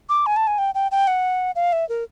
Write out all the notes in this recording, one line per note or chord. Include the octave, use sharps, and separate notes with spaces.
D6
G#5
A5
G#5
G5
G5
G5
F#5
F5
E5
A#4